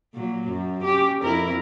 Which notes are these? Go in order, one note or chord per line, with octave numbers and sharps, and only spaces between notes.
A#2 F#3
F#2
C#4 G4
F2 E4 A#4